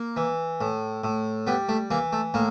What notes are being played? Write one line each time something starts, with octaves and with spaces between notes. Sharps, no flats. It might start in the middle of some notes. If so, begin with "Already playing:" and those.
Already playing: A#3
E3
A2
A2
G3 B3
A3
E3 A#3
A3
A2 A#3